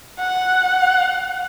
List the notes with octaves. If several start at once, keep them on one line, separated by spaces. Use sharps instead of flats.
F#5